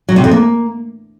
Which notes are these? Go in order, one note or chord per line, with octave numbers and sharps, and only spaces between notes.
F#3
C3
F2
A#3